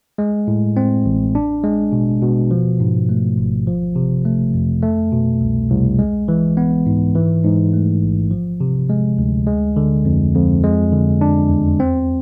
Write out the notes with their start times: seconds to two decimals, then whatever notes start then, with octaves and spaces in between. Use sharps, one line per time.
0.18 G#3
0.47 A2
0.77 C4
1.06 A1
1.35 D4
1.64 G#3
1.92 B2
2.22 B2
2.51 F3
2.80 G#2
3.09 A3
3.38 G#1
3.67 F3
3.96 C3
4.25 A3
4.54 F2
4.83 A3
5.12 B2
5.41 C2
5.71 C2
5.99 G#3
6.28 E3
6.57 B3
6.86 G#2
7.15 E3
7.44 G#2
7.73 A3
8.02 A1
8.31 F3
8.61 C3
8.89 G#3
9.18 D2
9.47 G#3
9.76 D3
10.05 F2
10.35 F2
10.63 G#3
10.93 D3
11.21 D4
11.50 E2
11.80 C4